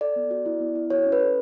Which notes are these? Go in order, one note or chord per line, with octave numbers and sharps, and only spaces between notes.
A4 D5
B3
F#4
E4
B3
E4
F#4 C#5
C#4
B4
A4